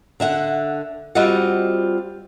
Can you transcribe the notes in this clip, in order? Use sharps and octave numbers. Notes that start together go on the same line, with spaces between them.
D3 E5 F#5
G3 C4 F4 F#4 D#5 F#5